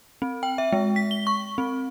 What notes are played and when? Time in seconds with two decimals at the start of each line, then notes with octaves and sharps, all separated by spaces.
0.22 C4
0.43 G5
0.58 E5
0.73 G#3
0.96 B6
1.11 G7
1.27 C#6
1.58 C4